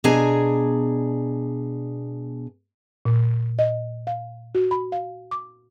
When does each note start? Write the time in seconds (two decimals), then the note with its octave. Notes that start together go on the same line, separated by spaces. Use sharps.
0.04 B2 D4 G#4 G#5 A#5
3.05 A#2
3.59 D#5
4.07 F5
4.55 F#4
4.71 B5
4.92 F5
5.31 D6